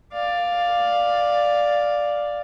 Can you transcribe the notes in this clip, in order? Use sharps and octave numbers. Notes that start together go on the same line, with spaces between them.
D5 F5